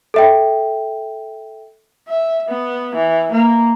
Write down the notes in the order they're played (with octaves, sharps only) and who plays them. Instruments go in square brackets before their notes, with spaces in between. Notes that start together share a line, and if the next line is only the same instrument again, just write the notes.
[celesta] A4 E5 G5
[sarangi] E5
B3
E3
A#3